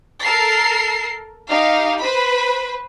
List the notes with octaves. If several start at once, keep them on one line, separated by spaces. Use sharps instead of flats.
A4 A#4 C7
D#4 G4 F5
B4 C5 B5